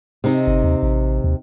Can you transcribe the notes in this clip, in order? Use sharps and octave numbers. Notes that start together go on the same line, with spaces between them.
C3 D#4
G1
D#2
A1
D#2